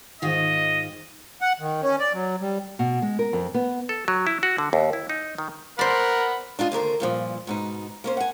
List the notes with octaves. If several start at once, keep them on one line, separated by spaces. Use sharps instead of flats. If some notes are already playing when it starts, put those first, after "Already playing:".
G#2 D#3 F4 D#5
F#5
D#3
C#4
D5
F#3
G3
B2
G#3
A#4
F2
B3
A4
F#3
E4
F#4
D3
D#2
E4
D#4
D#3
A#4 C5 D5 F#5 B5
D4 E4 F4 D#5
D#2 D3 A#4 C5
G2 A#2 F3
G#2 B2 D#4
A#3 C#4 C5
F#5 G#5